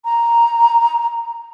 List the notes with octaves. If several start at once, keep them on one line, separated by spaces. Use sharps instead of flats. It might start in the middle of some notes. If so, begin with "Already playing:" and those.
A#5